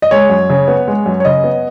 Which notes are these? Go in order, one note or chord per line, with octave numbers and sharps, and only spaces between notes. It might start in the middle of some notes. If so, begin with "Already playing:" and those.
D#5
G#3 C#5
F#2
C#3
B3
G#3
F#2
C#5
C#3 D#5
B3